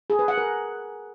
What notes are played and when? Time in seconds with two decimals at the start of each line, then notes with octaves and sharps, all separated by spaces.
0.10 G#4
0.19 B4
0.28 F#5
0.38 A#4